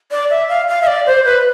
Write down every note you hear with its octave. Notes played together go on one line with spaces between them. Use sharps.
D5
E5
F5
F5
E5
D5
C5
B4